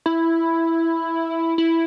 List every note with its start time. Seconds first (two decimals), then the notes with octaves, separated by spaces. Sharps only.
0.06 E4
1.58 E4